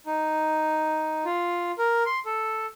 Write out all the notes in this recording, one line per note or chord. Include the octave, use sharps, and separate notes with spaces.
D#4
F4
A#4
C6
A4